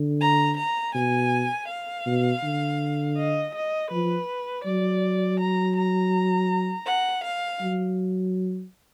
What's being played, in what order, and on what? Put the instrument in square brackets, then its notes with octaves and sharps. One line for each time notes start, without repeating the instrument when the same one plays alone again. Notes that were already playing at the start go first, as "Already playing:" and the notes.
Already playing: [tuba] D3
[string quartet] A#5
A#5
[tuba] B2 [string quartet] G#5
[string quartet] F5
[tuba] B2
D3
[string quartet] D#5
D#5
[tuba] F3 [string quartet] B4
[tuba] F#3 [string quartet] D5
[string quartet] A#5
A#5
F#5
F5
[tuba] F#3